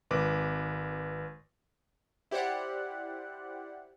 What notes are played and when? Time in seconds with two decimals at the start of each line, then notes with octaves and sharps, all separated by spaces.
0.11 G#1 B4 D6
2.31 E4 G4 C5 D5 F#5